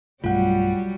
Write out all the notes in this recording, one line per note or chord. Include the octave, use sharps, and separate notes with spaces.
B1 G2 F#3 G3 A3 F4 F#4 F#5